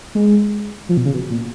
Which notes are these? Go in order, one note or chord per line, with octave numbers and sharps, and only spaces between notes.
G#3
F3
B2
C#3
B2
A#2